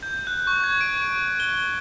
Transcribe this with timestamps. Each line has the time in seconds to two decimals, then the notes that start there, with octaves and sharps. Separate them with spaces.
0.03 G6
0.27 F#6
0.47 C#6
0.63 G#6
0.81 D7
1.40 G7